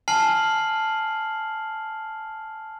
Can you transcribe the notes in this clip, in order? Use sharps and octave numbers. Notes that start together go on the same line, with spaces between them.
G#5 A5 F6 C7 F#7